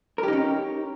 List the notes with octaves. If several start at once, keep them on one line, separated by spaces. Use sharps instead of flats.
C#4 D#4 G4 A#4